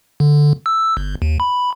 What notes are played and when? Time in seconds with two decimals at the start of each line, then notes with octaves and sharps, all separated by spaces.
0.20 D3
0.66 E6
0.97 G1
1.22 D#2
1.40 B5